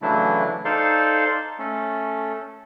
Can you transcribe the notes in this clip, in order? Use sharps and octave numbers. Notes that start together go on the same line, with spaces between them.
C#3 E3 F#3 A3 D4 E4
D#4 A4 C5 D5 F5 C6
A3 C#4 A4